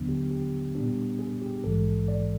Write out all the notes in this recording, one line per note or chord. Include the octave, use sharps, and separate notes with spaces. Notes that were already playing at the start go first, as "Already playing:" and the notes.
Already playing: D#2 D3 F#3 B3 D4
G4
G4
A#2 G3 B3 D4 G4
G#4
G4
A#1 G#2 E3 G#3 A4
D5